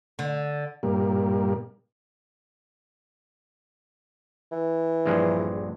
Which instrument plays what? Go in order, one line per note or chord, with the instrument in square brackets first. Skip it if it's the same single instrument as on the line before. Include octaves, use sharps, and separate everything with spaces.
[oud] D3
[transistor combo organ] G2 A#2 G3 A#3
[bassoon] E3
[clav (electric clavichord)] A#1 G2 G#3